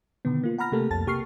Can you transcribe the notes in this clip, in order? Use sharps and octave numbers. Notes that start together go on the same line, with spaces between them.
B2 D3 D#3 B3
A#3 F4
F#5 A#5 B5 F6 A#6
C3 A3 A#3 G4 A4 A#4
C2 F2 A5 A6
C3 A#3 G4 C#6 F6 C7